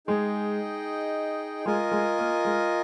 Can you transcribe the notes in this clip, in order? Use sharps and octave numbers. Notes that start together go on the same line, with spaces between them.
G#3 D#4 G#4 D#5 G5
G#3 F4 A#4 D#5 G#5
G#3
A#3
G#3